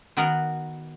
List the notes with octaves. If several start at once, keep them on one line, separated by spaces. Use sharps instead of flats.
D#3 B3 F#4 A#4 F#5